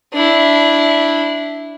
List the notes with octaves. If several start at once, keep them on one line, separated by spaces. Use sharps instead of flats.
D4 E4